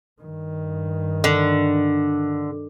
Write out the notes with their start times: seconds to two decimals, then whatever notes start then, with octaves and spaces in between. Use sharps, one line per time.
0.22 G2 D#3
1.24 D3